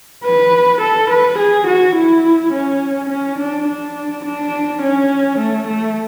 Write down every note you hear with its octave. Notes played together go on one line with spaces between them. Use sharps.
B4
A4
B4
G#4
F#4
E4
C#4
C#4
D4
D4
D4
C#4
A3
A3